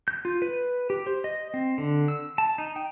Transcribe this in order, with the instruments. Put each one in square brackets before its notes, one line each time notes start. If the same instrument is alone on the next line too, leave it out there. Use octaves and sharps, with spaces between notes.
[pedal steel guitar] G6
F4
B4
G4
C5
D#5
C4
D3
E6
A5
D#4
G5